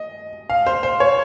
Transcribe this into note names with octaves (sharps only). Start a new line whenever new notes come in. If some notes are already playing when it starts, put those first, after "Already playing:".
Already playing: D#5
F5
C5
C5
C#5